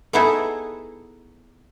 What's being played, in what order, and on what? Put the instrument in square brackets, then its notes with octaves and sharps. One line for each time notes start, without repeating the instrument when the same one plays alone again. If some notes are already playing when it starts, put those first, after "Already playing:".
[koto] A3 B3 D#4 E4 G#4 A4